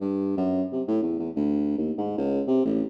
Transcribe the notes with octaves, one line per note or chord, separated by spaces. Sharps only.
G2
F#2
C3
A2
E2
E2
D2
D#2
G#2
C#2
C3
A1